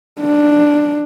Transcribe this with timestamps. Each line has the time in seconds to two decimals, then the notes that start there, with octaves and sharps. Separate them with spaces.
0.21 D4